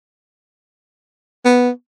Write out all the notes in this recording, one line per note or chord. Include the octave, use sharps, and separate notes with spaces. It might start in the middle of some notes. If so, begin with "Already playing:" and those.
B3